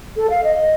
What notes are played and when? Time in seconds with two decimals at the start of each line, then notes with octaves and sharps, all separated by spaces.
0.17 A4
0.30 F5
0.44 D#5